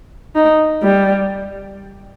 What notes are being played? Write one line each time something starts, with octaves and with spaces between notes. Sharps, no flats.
D#4
G3